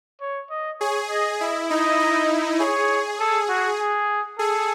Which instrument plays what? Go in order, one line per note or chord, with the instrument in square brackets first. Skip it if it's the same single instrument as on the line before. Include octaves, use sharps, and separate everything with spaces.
[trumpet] C#5
D#5
[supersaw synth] G#4 [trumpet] C#5
[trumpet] D#5
[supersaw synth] E4 [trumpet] D#5
[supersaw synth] D#4 [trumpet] D#5
[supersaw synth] E4
[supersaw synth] G#4 [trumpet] C#5
[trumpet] A4
F#4
G#4
[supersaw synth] G#4 [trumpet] A4